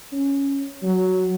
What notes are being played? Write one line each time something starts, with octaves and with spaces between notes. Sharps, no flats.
C#4
F#3